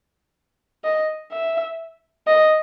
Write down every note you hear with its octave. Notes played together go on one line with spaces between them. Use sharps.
D#5
E5
D#5